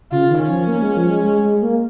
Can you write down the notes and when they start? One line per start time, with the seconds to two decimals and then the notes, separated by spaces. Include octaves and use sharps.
0.11 C#3 F4
0.30 D#3
0.39 C#4
0.49 F3
0.68 A#3
0.82 G#3
0.97 F3
1.10 G#3
1.24 G#3
1.43 G#3
1.62 A#3